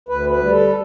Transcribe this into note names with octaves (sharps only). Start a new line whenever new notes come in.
D2 B4
B4
G3
A4